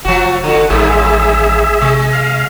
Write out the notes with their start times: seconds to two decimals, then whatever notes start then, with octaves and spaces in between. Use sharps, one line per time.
0.05 F1 F3 F#4
0.44 D3 F#4
0.70 A1 G2 D#3 G#4 E5
1.81 C3 G#3
2.13 F5